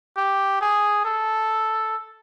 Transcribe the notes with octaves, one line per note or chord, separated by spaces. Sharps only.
G4
G#4
A4